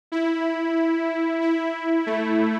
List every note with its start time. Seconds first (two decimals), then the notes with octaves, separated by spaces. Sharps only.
0.12 E4
1.41 E4
2.07 A3